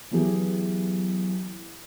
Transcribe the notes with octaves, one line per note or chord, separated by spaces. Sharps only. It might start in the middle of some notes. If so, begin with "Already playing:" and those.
E3 F#3 B3 E4 G4 G#4